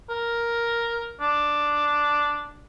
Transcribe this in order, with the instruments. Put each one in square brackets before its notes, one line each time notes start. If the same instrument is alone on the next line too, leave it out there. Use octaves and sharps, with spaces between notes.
[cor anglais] A#4
D4